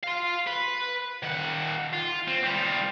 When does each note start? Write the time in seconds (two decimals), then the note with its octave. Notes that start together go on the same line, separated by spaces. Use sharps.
0.04 F5 C6
0.47 B4
1.23 D#3 F#5
1.93 F4
2.28 C4
2.44 G3 F4